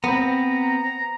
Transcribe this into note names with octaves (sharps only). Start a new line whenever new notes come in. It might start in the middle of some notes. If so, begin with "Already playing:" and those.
B3 C4 A#5